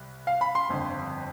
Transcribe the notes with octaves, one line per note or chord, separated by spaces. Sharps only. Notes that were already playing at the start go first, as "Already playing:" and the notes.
Already playing: C2
F5
B5
C6
G1 F2 D3